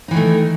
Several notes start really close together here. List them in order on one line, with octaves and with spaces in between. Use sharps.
D#4 E3 D#3 A3